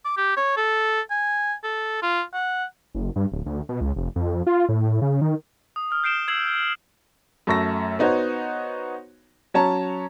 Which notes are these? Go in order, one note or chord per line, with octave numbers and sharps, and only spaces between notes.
D6
G4
C#5
A4
G#5
A4
F4
F#5
F#1
G2
D1
D2
B2
C#2
F1
F2
F4
A2
C#3
D#3
D#6
D#6 F6
G6 C7 D7 E7 G7
E6 G#6 C7 E7 F#7
F#2 A3 C#6 E6 A#6
B3 D#4 F#4 C5 C#5
F#3 C#4 C#5 A5 A#5